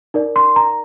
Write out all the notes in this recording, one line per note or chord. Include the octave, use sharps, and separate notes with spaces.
D#4 A#4 D5
C6
A#5